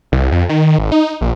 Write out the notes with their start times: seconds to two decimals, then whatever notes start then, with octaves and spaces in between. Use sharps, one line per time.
0.12 C2
0.32 F2
0.49 D#3
0.78 G#1
0.92 D#4
1.21 A#1